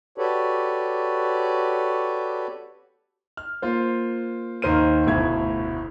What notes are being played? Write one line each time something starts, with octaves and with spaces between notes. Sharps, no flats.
F#4 G4 A4 B4 C#5 D5
F6
A#3 F4 C5
D#2 D#3 C5 F6 D#7
F1 D2 B2 E4 G#6